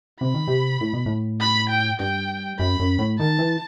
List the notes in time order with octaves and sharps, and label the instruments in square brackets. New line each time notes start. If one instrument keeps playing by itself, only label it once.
[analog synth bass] C3 [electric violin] B5
[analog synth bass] D#3
C3
A2
B2
A2
[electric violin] B5
G5
[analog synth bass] G2 [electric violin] G5
[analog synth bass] F#2 [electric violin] B5
[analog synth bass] F#2
A2
[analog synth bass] D#3 [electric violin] A5
[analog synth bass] E3